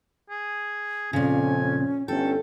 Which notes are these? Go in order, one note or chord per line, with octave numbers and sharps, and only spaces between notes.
G#4
F2 A#2 C#3 C#4 G#5
G1 C#4 A4 G5